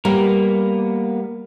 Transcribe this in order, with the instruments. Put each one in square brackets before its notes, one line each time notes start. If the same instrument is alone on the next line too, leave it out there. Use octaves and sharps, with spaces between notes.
[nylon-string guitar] G3 [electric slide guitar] A#3 B3 A#4